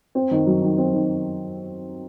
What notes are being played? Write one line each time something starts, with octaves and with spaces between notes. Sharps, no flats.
C4
D#3
F#3
D#3
C4
D#3